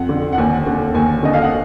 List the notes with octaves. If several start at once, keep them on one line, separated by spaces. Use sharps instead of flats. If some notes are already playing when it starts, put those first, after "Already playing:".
Already playing: F2 F#5
D3
F#5
D#2 G#5
D3
D#2 G#5
D3 D#5
F5
F#5